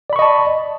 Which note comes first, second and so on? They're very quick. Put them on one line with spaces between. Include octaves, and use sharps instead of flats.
D5 B5 C#6 D#5 A5